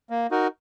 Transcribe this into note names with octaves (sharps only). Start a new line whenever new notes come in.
A#3
D#4 F#4 A#4